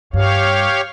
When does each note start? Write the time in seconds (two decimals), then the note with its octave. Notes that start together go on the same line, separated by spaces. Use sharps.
0.13 G2 G4 C#5 F5